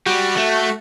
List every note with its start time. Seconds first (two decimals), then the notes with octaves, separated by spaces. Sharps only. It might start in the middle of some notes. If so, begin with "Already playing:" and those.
0.06 G3 F#4
0.37 A3